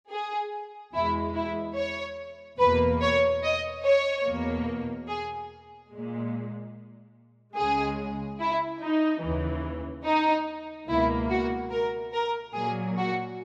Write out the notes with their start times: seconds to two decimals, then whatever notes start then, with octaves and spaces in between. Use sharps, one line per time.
0.10 G#4
0.93 E2 B2 G#3 E4
1.35 E4
1.76 C#5
2.59 E2 B2 A#3 B4
3.01 C#5
3.43 D#5
3.84 C#5
4.25 E2 B2 A#3
5.08 G#4
5.91 A#2 G#3
7.56 C#2 C#3 G#3 G#4
8.40 E4
8.82 D#4
9.22 D#2 C#3 E3
10.05 D#4
10.88 C#2 B2 A#3 E4
11.29 F#4
11.71 A#4
12.13 A#4
12.54 A#2 F#3 A#3 G#4
12.96 F#4